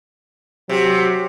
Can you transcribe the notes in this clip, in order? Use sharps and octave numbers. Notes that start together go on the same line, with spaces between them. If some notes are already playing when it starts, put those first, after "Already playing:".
C3 F#3